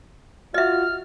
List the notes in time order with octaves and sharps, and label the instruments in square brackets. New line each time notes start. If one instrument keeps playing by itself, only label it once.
[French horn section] F4 F#4 [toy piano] D#5 E5 [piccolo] F6